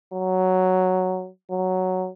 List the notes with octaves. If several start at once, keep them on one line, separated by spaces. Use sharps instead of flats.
F#3
F#3